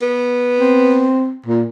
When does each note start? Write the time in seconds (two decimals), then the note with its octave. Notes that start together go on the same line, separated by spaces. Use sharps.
0.02 B3
0.60 C4
1.46 A#2